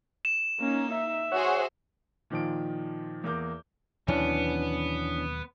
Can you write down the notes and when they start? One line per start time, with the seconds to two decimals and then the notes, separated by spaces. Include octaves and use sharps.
0.25 E7
0.60 A#3 C#4 D#4
0.93 E5
1.32 F#4 G#4 C5 C#5 F#5
2.30 A#2 D#3 F3 D7
3.24 E2 A#3 D6 G6
4.08 D#2 B2 E3 F#3 B3 C#4 D4